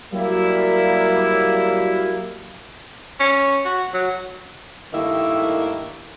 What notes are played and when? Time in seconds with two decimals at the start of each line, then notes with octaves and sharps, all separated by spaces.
0.13 F#3 G3 A#3 E4
3.20 C#4
3.65 F#4
3.94 F#3
4.93 G2 D#3 A3 A#3 E4